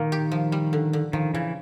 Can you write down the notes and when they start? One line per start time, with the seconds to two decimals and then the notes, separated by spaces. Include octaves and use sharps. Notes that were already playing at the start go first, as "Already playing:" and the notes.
Already playing: A#2 D#3 A#3
0.12 G4
0.32 F3
0.52 G3
0.73 D3
0.93 D3
1.13 D#3 F3
1.34 C#3 E3